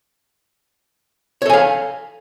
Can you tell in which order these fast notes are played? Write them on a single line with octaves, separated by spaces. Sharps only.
C#5 A4 G#5 F5